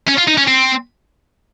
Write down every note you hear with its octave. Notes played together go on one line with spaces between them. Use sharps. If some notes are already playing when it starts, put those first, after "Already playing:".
C#4
F4
D#4
C#4
C4